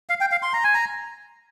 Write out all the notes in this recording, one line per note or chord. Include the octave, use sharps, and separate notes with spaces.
F5
G5
F5
C6
A#5
G#5
A#5